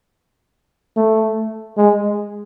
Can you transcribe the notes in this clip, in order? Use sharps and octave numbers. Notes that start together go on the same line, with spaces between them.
A3
G#3